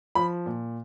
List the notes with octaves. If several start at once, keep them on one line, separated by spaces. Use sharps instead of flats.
F3 B5
A#2